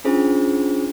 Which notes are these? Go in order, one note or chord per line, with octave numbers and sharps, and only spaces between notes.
C#4 D4 F4 G#4 C5